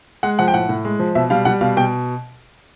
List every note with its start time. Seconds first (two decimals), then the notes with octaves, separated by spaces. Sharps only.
0.23 G#3 F#5
0.39 F3 F#5
0.48 G5
0.54 A2 F#5
0.69 A2
0.85 G#3
0.99 F3
1.15 B2 E5
1.30 G3 F5
1.45 G3 F#5
1.61 B2 F5
1.77 B2 G5